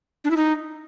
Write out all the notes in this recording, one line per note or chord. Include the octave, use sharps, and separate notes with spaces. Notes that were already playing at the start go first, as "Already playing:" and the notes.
D4
E4
D#4